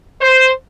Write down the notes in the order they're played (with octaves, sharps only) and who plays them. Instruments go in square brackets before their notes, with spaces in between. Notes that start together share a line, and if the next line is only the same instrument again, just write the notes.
[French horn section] C5